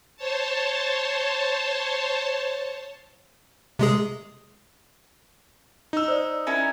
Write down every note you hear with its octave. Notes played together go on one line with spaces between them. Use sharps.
C5 C#5 A5
C3 G#3 G#4
D#4 E6
C5 D5
C#4 E4 A#4